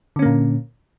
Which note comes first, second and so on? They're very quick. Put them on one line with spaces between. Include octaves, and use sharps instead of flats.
D3 C#4 A#3 A#2